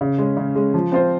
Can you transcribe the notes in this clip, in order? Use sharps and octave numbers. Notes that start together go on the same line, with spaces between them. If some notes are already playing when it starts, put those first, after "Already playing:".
C#3
G#3 C#4
C#3
G#3 C#4
F3
C4 F4 C5